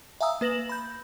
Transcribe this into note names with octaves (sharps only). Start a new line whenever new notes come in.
E5 F5 G#5 A#5 D#6 E6
A#3 B4 A#6 E7 F#7
B5 G6